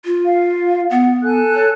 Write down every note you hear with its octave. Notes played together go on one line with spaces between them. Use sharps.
F4
F5
B3 F#5
A4 G#5 F#6
C#5